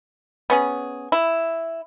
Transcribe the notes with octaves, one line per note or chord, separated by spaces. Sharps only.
B3 C#4 G#4
E4